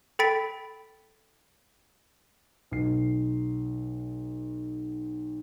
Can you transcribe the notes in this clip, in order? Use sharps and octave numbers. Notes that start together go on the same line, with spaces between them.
A4 G5 B5 A6 B6 D7
B1 C7